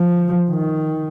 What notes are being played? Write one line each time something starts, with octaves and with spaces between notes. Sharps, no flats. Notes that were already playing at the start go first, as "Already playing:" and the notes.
Already playing: F3
D#3